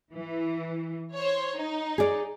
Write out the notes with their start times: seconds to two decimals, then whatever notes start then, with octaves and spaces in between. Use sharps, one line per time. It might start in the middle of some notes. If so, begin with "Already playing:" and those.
0.13 E3
1.15 C5 C#5
1.55 D#4
1.98 G#4 D5